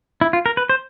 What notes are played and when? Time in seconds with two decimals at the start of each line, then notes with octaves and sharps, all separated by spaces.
0.21 E4
0.33 F4
0.46 A#4
0.57 B4
0.69 C5